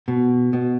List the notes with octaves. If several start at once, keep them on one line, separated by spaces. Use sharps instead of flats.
B2
B2